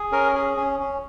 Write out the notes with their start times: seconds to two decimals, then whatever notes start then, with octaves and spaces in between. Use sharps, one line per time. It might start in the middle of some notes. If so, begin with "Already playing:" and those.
Already playing: G#4
0.12 C#4 A#4
0.35 G#4
0.57 C#4
0.80 C#4